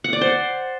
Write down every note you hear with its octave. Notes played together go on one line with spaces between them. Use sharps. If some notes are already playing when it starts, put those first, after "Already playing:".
F#5
D5
C5